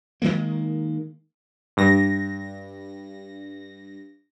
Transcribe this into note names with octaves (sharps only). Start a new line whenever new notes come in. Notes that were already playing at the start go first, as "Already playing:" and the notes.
D#3 E3 G#3 A#3
G2 A#6